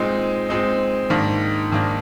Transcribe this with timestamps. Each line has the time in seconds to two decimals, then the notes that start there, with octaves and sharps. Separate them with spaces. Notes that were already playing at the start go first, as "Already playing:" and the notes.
Already playing: A#2 G#3 C4 D#4
0.49 A#2 G#3 C4 D#4
1.10 G#2 D#3 A#3 D4
1.71 G#2 D#3 A#3 D4